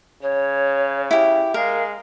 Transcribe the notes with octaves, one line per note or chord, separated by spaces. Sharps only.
C#3 C#5
E4 G4
G#3 A#4 F5